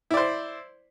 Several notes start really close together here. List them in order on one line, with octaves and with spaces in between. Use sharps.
E4 D5 C5